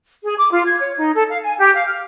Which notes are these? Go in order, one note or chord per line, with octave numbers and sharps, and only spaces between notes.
G#4
D6
F4
G#6
C#5
D#4
A4
F5
G#5
G4
F5
F6